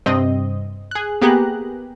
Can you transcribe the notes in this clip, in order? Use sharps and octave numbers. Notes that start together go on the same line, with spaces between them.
G2 C3 C4 D#5
G#4 F#6
A#3 B3 G4 G#4 A#5 F#6